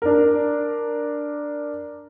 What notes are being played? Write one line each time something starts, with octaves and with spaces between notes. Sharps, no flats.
D4 A#4